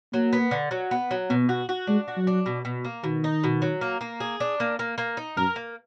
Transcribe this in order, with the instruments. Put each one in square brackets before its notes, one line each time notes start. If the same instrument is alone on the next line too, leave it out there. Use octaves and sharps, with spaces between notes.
[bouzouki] F#3 [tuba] A#3
[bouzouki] B3
D3
F#3
B3
F#3
[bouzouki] B2 [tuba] B3
[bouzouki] F#4
F#4
[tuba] G#3 [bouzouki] D4
[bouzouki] F#4
[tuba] F#3
[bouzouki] D4
B2
B2
A#3
[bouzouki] B2 [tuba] D#3
[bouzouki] D#4
B2
F#3
A#3
A#3
G#4
D4
A#3
A#3
A#3
D#4
[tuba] F#2 [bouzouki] A#4
[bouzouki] A#3